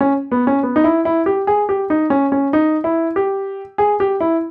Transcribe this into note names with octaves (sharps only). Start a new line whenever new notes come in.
C#4
B3
C#4
B3
D#4
E4
E4
G4
G#4
G4
D#4
C#4
C#4
D#4
E4
G4
G#4
G4
E4